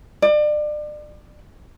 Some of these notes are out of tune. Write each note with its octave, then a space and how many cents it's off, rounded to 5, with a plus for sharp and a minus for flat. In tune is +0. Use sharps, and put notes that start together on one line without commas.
D5 +30